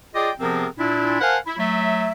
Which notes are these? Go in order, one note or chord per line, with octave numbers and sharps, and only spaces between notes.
F4 G#4 D5 D#5 G5 D6
C3 F3 B3 C4 G#4 A#4
A#2 D4 E4
A#4 C5 F5 F#5 G#5 A5
E4
F#3 A3 E5